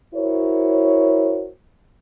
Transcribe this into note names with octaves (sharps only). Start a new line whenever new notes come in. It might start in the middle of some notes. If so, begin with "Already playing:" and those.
E4 F#4 A#4 C5 C#5